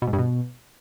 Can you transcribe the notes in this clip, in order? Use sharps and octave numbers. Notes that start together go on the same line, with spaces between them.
B2
G#2
G2
B2